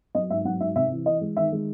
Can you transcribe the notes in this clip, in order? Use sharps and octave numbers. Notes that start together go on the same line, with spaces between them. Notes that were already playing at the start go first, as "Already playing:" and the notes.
F#3 D#5
G#2 E5
F#3 F#5
G#2 E5
C3 E5
E3
E3 D#5
G#3
D#3 E5
G#3